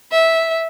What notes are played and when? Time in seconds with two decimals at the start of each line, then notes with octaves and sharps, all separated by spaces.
0.12 E5